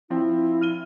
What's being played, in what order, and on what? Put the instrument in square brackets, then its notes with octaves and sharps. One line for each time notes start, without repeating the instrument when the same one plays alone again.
[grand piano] F3 C4 [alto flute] E4
[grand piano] F6 D#7 G7